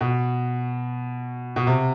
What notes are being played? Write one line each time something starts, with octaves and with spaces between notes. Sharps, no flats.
B2
B2
C3